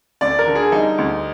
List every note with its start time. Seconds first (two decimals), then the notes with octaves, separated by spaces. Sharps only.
0.21 D2 D5
0.39 A#4
0.47 D3
0.55 G#4
0.72 G3 D#4
0.98 D2